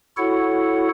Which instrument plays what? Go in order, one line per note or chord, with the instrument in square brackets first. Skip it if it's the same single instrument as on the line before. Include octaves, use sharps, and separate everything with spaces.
[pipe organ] E4 F#4 A4 C#5 F#5